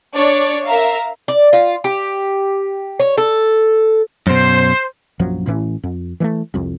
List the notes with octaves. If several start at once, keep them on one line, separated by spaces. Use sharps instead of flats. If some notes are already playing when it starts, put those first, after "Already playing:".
D4 C#5 D5
A#4 E5 F5 A#5
D5
F4
G4
C#5
A4
F#2 B2 C5
A#1 F#2 F3 F#3
A1 A2 E3 C#4
F2
E3 G#3 A3
C2 F2